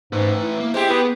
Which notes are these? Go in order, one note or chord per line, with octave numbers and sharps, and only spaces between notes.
G#2 A3 B4
E4
A#3
G#3 G4 C5 G5
B3 B4